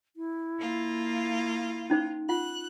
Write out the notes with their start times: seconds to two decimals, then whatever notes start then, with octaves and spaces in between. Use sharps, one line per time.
0.16 E4
0.59 A#3 F4
1.90 C#4 D#4 C5
2.29 F4 F#5 F#6